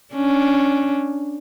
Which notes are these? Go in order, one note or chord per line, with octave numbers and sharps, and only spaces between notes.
C#4 D4